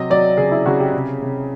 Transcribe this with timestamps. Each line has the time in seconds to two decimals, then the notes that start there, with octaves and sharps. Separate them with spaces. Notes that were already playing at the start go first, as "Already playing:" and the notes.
Already playing: C3 F#3 D#5
0.10 F#3 D5
0.37 C#3 G#4
0.51 E4
0.66 C#3 F#4
0.80 G4
0.93 C3
1.22 C3